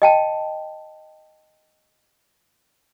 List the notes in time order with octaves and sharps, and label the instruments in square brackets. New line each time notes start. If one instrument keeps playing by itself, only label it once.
[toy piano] D#5 G5 A5